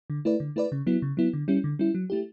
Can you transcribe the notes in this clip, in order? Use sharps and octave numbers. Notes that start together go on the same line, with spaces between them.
D3
A3 E4 B4 D5
D3
A3 E4 B4 D5
C#3
F#3 B3 E4
C#3
F#3 B3 E4
D3
G3 C#4 E4
D3
G3 C#4 E4
F#3
A3 E4 G4